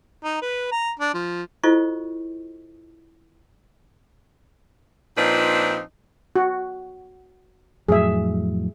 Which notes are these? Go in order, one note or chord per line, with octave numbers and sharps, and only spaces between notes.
D#4
B4
A#5
D4
F3
E4 F4 A4 C5 D#5 C#6
A#2 F3 C4 D4 D#4 B4
F#4
F2 A2 F#3 G#4 E5